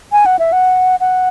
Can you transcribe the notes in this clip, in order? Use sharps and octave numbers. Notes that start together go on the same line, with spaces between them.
G#5
F#5
E5
F#5
F#5